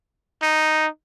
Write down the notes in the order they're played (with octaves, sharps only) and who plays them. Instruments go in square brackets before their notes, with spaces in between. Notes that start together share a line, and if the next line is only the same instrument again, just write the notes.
[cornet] D#4